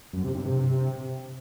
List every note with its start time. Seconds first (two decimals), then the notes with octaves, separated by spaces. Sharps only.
0.13 F#2
0.24 C3
0.35 G2
0.45 C3